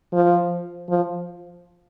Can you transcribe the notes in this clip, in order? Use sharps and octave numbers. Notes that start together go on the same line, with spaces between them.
F3
F3